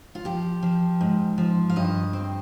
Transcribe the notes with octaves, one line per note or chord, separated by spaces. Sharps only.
F4
F3 G4
F3
G#2
F3
F5
G2 D#5
C4